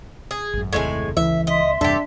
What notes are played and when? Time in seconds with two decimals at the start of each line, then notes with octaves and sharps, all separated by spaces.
0.31 G#4
0.53 G#1 F#2
0.73 F#1 D#2 A2 C3 G#3 G#5
1.17 C#2 E3 E5
1.47 D#5 E5 C6
1.81 E2 G2 C3 D4 G4 A4